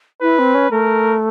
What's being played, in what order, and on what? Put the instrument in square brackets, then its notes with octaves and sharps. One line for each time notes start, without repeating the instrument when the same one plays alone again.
[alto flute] E4 [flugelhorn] B4
[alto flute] C4
C#4
[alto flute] A3 [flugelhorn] A#4